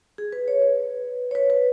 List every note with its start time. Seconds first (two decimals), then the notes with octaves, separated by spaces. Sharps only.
0.18 G#4
0.33 B4
0.48 C#5
0.62 B4
1.31 C#5
1.35 B4
1.50 B4